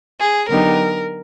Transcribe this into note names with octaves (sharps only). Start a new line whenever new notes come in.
G#4
D3 F#3 B3 D#4 G4 A#4